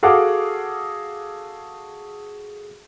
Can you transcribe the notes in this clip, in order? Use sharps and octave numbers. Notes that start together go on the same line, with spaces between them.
F#4 G#4 A4 F5 F#5 D6